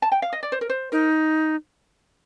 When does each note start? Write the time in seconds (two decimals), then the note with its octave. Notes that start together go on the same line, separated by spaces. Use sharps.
0.02 A5
0.12 G5
0.22 F5
0.33 D#5
0.43 D5
0.52 C5
0.61 A#4
0.70 C5
0.92 D#4 A#4